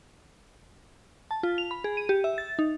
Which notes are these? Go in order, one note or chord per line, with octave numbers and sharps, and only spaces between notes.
A5
F4
F7
B5
G#4
D#7
G4
E5
A6
D#4